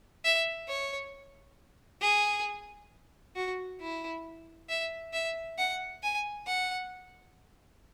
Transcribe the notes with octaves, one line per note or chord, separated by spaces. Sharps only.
E5
C#5
G#4
F#4
E4
E5
E5
F#5
G#5
F#5